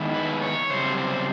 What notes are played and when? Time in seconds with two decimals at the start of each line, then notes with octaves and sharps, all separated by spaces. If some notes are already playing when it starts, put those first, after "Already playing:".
Already playing: D#3 G#3 B3 E4
0.14 B4
0.42 C#5
0.70 F#2 C#3 G3 C4 C5
0.97 C5